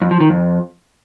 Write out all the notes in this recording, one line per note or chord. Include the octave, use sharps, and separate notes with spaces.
F2
F3
D#3
F2